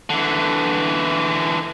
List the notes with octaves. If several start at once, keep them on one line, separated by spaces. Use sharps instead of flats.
D3 E3